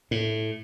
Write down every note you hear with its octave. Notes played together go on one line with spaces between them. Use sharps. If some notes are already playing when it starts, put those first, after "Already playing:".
A2